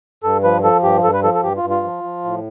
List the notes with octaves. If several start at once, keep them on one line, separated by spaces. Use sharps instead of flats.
G2 A4
F3 B4
F3 A4
G2 G4
G2 A4
B4
F3 A4
A4
G2 G4
F4
G2
F4
F3
F3
A2